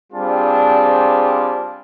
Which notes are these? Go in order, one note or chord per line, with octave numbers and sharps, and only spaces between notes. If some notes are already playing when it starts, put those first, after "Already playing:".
G3 C4 D4 F4 G#4